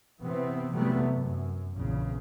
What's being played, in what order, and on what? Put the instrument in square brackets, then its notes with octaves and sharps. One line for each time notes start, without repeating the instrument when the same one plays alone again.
[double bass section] C3 E3 B3 C4
C3 E3 F#3 G3 A3 B3
F#2
A#1 E2 C#3